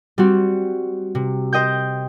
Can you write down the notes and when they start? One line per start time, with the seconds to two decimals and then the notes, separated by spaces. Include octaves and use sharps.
0.18 G3 C4 F#4
1.15 C3
1.53 C5 D#5 G5 G6